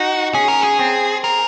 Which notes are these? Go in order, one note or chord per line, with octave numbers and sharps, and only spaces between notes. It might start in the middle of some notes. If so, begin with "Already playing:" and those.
Already playing: D#4 F#4
C#4 G#4
A#4
G#4
C4
A#4